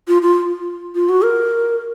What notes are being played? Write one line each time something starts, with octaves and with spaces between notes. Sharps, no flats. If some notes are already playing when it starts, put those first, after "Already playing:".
F4
F4
F4
F#4
A#4